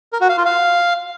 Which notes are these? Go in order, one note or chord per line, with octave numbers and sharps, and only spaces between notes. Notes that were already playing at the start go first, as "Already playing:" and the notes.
A#4
F#4
F5
F4
F5